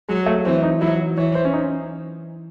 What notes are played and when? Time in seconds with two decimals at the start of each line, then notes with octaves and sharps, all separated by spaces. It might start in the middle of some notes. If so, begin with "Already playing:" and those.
0.09 F#3 G#3
0.26 A3
0.45 E3 C4
0.63 D#4
0.80 F#3 E4
1.17 E3 C#5
1.35 C5
1.45 C#4
1.53 D#4